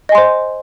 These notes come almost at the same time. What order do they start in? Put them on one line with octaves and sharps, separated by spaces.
D#5 G#5 C6 C5